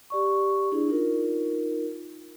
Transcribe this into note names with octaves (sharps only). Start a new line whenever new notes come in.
G4 D5 C#6
D4 E4 G#4
D#4 F4 A#4